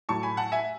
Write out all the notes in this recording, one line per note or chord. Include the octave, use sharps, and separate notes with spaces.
A2 F#3 A5 C#6
G#5 B5
F#5 A5
E5 G#5